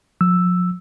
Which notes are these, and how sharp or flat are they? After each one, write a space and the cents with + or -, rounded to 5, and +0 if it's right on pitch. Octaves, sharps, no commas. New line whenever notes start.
F3 +45 E6 +0